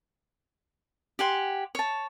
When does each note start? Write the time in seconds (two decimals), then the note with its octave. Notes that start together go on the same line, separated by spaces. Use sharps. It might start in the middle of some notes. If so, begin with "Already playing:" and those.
1.19 G4 F#5 G#5 C6
1.75 C#5 A5